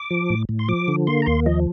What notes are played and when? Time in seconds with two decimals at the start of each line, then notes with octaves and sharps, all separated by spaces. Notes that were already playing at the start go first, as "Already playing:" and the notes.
Already playing: D6
0.11 F3
0.30 A2
0.49 A2
0.59 C6
0.68 F3 D6
0.88 D3
1.07 A#3 C6
1.22 A#5
1.26 D#2 C6
1.46 F3 D#5